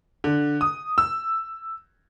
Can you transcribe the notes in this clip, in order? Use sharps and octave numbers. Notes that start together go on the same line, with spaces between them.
D3
D#6
E6